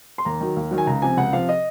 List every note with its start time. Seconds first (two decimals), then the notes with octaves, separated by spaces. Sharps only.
0.18 C6
0.25 D#2 A#5
0.41 D#3 F#3
0.56 D#2
0.71 D#3 F#3
0.78 G#5
0.87 C#2 A#5
1.02 C3 F3 G#5
1.17 C#2 F#5
1.32 C3 F3 F5
1.49 D#5